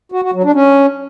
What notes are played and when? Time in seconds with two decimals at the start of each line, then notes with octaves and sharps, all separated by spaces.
0.12 F#4
0.22 F#4
0.33 F#3
0.43 D4
0.54 C#4